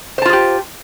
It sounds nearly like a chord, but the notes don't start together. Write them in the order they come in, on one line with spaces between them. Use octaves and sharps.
C5 A5 F4 G#4 G4